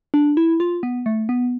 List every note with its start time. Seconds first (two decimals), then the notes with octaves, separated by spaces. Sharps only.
0.14 D4
0.37 E4
0.60 F4
0.83 B3
1.06 A3
1.29 B3